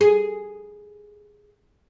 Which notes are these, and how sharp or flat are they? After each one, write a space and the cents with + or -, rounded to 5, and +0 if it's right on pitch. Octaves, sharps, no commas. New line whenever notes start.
G#4 +0